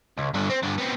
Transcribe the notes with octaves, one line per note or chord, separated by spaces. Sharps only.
C#2
G2 D3
C4
G2 D3
B3 C4